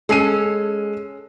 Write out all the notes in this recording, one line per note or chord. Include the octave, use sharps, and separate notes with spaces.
G#3 C#4 A4 C7 D#7